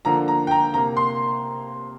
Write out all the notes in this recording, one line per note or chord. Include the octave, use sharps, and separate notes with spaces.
D3 F3 A#3 A#5
A#5
G5
A#5
C3 A#3 A#5
C6